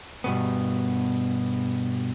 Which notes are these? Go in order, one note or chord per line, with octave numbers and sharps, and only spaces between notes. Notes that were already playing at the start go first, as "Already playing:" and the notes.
G2 B2 B3